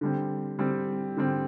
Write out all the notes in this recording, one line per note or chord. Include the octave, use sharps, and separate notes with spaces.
D3 G3 C4
D3 G3 C4
D3 G3 C4